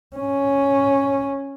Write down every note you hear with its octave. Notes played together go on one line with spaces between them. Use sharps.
C#4